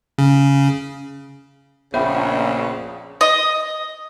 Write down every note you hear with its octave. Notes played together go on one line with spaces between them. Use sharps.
C#3
A#1 C#3 B3 C5 E5 F#5 G5 B5
D#5